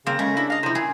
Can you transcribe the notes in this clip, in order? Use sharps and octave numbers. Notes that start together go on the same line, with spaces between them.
C#3 A#3 C4 A#6
C#3 G#3 A3
D4 E4
D#5 F5 A#6
C3 F3 E4
A#2 G#4